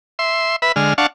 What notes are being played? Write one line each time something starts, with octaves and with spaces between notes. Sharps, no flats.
E5 C6
B4 E5 B5
D3 G#3 F6
D4 F5 F#5 A5 C#6